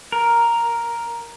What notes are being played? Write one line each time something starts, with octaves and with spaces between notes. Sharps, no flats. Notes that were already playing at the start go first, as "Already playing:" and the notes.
A#4